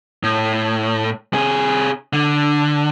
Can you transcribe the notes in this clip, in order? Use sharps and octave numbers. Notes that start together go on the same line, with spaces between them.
A2
C3 G#4
D3